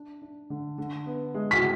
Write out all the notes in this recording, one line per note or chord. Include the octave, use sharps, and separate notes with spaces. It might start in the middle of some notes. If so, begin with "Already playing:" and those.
Already playing: D4
D4
D3
D3
B3
G#3
B6